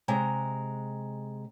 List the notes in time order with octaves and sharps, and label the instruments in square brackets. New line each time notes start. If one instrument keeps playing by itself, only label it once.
[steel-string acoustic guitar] C3 G#3 A#5